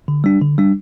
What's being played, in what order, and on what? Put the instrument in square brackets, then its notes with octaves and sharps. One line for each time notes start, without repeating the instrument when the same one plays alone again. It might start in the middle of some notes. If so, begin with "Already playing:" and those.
[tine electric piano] D3
G3 D4
D3
G3 D4